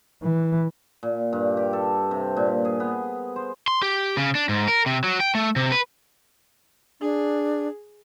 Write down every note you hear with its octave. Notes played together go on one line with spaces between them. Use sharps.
E3
A#2
G2
G4
A4
C3
A#2
G#4
B3
C5
C6
G4
C#3
D4
G#2
A#4
C3
F#3
G5
A3
C3
B4
D4 G#4